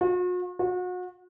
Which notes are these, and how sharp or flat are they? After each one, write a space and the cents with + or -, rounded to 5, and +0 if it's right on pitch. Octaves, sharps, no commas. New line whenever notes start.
F#4 -45
F#4 -35